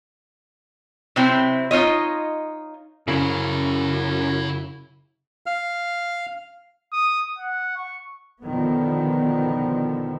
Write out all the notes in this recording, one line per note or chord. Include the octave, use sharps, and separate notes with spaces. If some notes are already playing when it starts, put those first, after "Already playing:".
C3 F#3 C4 E4
D#4 F4 C#5 D#5
F#2 C#3 E4 C5
F5 F6
D#6
F#5
C#6
B2 D3 D#3 F3 B3